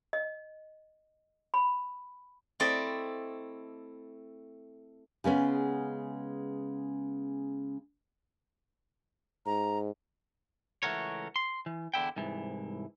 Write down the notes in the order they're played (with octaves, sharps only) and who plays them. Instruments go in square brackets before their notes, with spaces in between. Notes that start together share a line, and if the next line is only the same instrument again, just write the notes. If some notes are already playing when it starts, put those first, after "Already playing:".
[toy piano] D#5
B5
[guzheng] A3 C4 E4 A4 D5 D#5
[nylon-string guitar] C#3 G#3 B3 C#4
[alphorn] G#2 [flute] A#5
[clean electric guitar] C#2 E3 A3 F#4 A#4 C#5
C6
E3
E2 D3 E4 G5
C2 G#2 E3